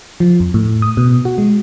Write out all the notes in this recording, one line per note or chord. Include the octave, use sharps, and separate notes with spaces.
F3
F2
A2
D#6
B2
F#4
G#3